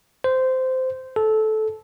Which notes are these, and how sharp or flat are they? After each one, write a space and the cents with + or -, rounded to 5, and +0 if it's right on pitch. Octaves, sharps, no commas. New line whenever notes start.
C5 -15
A4 -15